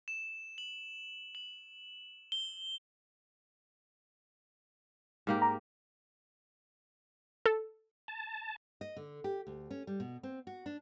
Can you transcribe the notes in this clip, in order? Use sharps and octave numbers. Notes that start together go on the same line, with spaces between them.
E7
F#7
F#7
G7
G#2 A#3 G4
A#5
A4
A5
D#5
D3
G4
D2
C#4
G3
B2
C4
F#4
D4